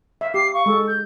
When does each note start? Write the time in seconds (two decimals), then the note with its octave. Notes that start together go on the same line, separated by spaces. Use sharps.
0.21 E5 F5
0.34 G4 D6 C7
0.54 F5 C#6
0.66 G#3 A4
0.88 G6